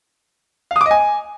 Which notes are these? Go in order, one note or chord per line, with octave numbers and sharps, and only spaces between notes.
F5
D#6
D6
D#5
G#5